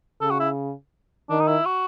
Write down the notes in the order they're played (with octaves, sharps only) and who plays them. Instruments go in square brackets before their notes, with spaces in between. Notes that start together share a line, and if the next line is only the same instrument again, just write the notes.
[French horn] C#3 [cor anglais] A4
[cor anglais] F#4
E4
[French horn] D#3 [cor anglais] D4
[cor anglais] D#4
E4
F#4